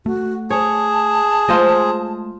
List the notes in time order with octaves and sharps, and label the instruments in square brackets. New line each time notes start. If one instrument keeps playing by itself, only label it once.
[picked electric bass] A3 [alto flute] F#4
[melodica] G#4 [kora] C#5 [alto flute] A5
[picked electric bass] G#3 A3 [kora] F4 C5 D#5